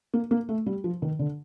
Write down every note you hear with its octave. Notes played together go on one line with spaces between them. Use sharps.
A#3
A#3
A3
G3
F3
D#3
D3